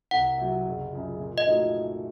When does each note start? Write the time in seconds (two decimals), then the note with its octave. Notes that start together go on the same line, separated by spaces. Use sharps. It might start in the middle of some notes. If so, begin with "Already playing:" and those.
0.11 C2 F#5
0.38 C3 F#3
0.65 F#1
0.93 F#2 C#3 F3
1.19 A#2
1.38 D#5
1.46 F3 A3 D#4 F#4